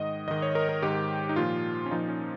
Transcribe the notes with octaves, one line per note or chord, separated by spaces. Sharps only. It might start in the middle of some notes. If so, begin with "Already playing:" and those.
Already playing: G#2 D#3 D#5
G#2 D#3 D#5
C#5
A#4
A#4
G#2 D#3 G4
D#4
A#2 F3 F4
C#4
A#2 F3 D#4
C#4